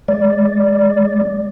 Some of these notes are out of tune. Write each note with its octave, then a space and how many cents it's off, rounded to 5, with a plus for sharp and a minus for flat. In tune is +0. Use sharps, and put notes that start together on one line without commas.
G#3 +0 D5 +0